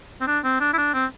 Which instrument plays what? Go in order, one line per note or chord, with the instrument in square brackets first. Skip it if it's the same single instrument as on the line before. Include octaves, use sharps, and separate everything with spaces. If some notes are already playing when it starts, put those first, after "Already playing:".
[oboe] C4
D4
C4
D4
E4
D4
C4